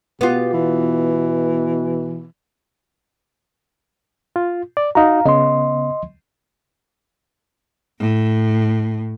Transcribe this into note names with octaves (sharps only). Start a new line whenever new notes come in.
B2 B3 F4 G4
E3
F4
D5
D#4 F#4 F5 A#5
C#3 B3 D#5 C6
A2